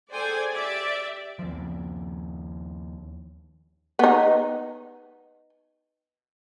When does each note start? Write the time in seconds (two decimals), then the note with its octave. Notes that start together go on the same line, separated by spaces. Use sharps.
0.12 G#4 A4 C5 D5 G5 G#5
0.53 G4 D5 E5
1.39 D#2 F3
3.99 B3 D#4